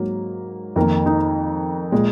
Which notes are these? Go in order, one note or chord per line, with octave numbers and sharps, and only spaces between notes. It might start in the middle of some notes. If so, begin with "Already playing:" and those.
Already playing: G#2 F#3 A#3
F2 D#3 A#3 A#4
D#4
A#2 G#3